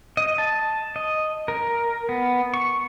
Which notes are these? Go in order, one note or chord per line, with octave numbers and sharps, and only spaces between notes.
D#5
A5
D#5
A#4
B3
C#6